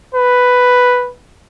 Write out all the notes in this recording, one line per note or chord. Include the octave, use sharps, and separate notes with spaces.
B4